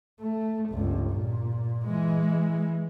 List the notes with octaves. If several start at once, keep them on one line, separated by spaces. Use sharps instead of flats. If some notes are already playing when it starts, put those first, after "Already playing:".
A3
G1 C#2
A#2
E3 G#3